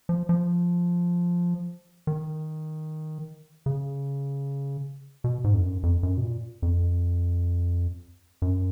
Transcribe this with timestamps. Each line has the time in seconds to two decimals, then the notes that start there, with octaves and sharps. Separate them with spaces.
0.09 F3
0.29 F3
2.07 D#3
3.66 C#3
5.24 B2
5.44 G#2
5.54 F2
5.64 F#2
5.83 F2
6.03 F#2
6.17 B2
6.23 A#2
6.62 F2
8.42 F#2